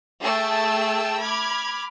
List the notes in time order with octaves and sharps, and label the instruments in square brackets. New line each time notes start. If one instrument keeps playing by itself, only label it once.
[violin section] A3 G#4 G5 A5 E6
B5 D6 F6 G#6